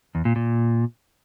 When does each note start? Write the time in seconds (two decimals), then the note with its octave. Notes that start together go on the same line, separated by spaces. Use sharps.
0.15 E2
0.25 A#2
0.36 A#2